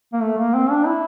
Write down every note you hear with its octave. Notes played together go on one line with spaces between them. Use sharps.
A#3
A3
A#3
C4
D4
E4